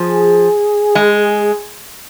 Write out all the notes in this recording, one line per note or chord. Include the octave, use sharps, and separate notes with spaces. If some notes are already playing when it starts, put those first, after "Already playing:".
Already playing: F3 G#4
G#3